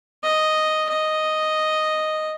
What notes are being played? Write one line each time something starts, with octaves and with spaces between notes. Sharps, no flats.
D#5
D#5